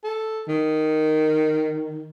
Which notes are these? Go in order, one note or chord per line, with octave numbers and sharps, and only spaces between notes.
A4
D#3